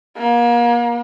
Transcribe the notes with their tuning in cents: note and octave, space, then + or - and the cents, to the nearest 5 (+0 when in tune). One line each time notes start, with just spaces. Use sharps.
A#3 +35